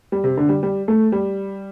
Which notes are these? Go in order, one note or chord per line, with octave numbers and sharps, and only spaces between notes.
G3
C3
D3
G3
G3
A3
G3